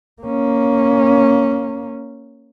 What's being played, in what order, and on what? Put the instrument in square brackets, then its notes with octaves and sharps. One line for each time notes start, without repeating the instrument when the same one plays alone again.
[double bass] A#3 C#4